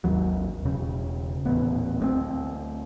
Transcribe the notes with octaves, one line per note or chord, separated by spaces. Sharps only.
G#1 D#2 F#3
E1 C#3
D#1 A1 B3
D2 G#3 C4